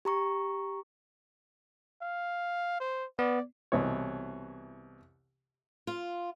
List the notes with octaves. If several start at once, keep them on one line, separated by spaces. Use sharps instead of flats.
G4 A#5 C#6
F5
C5
B3 D5
C2 B2 E3 C#5
F4